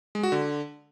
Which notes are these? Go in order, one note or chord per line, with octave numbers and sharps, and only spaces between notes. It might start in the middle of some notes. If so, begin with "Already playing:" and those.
G#3
F#4
D3